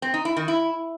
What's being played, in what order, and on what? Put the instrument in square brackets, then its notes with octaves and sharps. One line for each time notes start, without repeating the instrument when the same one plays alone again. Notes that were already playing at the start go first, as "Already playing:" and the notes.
[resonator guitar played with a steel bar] C4
D#4
E4
D#3
E4